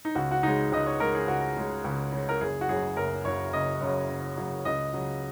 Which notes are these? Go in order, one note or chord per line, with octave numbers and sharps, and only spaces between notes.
D#4
C#2 F#4
F#4
C#3 G#3 D#4
C#2 D#5
C#5
C#3 G#3 A#4
G#4
C#2 F#4
C#3 G#3
C#2
C#3 G#3
A#4
F#1 G#4
F#4
F#2 C#3 F#3 G#4
F#1 A#4
F#2 C#3 F#3 C#5
F#1 D#5
F#2 C#3 F#3
F#1
F#2 C#3 F#3
C#2 D#5
C#3 F#3